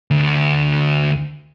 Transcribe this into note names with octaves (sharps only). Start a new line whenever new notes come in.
D2